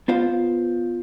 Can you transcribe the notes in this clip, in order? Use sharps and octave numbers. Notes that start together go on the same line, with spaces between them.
B3 F4 C5 F5